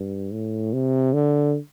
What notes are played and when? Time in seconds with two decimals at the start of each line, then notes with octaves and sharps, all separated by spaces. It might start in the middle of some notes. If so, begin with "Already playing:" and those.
Already playing: G2
0.32 A2
0.73 C3
1.13 D3